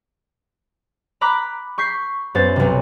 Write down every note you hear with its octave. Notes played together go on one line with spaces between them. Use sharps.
A#5 B5 D6 F#6 B6
C#6 G6 B6 C7
F#2 B3 C5 A6
B1 C3